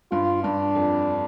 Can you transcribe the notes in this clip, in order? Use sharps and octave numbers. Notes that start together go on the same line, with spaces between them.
G2 F4
G2 D4
F2